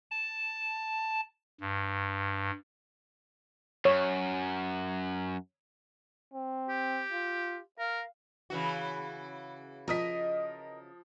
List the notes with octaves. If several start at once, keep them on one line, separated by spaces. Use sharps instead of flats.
A5
G2
F#2 C#5
C4
G4
F4
A#4 F5
C#3 E3 F#4
F3 A#4 D#5 D#6 B6